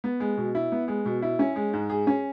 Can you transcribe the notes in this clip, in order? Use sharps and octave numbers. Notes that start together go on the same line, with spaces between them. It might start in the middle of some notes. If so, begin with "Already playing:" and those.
B3
G#3
B2
E4
B3
G#3
B2
E4
C#4
G#3
G#2
G#4
C#4